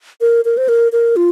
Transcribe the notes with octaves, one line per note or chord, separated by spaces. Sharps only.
A#4
A#4
C5
A#4
A#4
F4